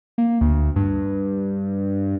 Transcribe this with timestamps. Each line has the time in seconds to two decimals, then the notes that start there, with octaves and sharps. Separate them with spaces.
0.18 A#3
0.41 D2
0.76 G2